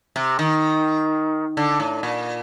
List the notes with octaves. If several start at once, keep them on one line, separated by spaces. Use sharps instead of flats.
C3
D#3
D3
A2
A#2